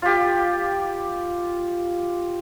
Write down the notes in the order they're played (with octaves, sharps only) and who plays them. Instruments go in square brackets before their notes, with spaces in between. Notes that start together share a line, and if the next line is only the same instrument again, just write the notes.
[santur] F4 G4